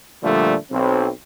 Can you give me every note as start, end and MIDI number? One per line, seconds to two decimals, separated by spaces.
0.23 0.56 46
0.23 0.56 50
0.23 0.56 53
0.23 0.56 55
0.23 0.56 57
0.72 1.09 35
0.72 1.09 60